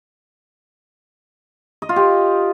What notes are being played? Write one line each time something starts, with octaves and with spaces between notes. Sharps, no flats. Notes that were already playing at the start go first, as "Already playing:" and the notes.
D#5
F4
G4